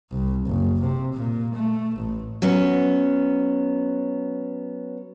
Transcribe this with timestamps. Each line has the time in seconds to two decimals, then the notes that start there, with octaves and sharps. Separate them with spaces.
0.12 C2
0.47 F#1
0.81 C3
1.14 A#2
1.55 A3
1.96 A1
2.42 F#3 B3 C#4